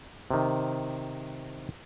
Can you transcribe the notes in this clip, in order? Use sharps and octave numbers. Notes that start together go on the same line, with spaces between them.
C3 D#3